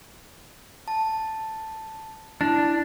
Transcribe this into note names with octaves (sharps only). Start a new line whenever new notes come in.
A5
D4 E4